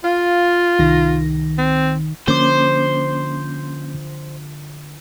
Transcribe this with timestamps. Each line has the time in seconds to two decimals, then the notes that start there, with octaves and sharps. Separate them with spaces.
0.04 F4 F5
0.79 C2 D#3 A#6
1.58 C4
2.28 D3 F3 A#3 C#4 C5 D6